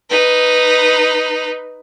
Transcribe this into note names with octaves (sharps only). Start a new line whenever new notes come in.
D#4 B4